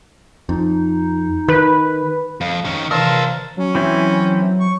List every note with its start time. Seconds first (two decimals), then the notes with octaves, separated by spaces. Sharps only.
0.49 F2 D#4
1.48 D#3 B4
2.41 F2 F5
2.65 D#3 C#4
2.91 C3 D#3 E3 A#4 C5 F5 A5 E6
3.57 F#3 C#4
3.75 E3 C4 E4
4.60 C#6